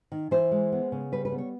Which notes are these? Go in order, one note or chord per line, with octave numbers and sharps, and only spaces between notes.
D#3
E3 C5
G#3
B3
C#3
G3 B4
B4
B3
C#5